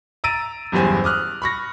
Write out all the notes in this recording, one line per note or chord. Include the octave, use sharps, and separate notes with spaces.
A#5 E6 A6 D7 D#7
F#1 E2 G2 G4 C5 G#5
D6 D#6 F6 F#6
B5 C#6 A#6